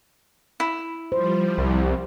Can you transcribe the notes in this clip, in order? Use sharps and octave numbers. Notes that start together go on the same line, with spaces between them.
E4
F3 G3 C5
C2